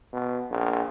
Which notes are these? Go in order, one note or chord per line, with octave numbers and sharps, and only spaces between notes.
B2
A#1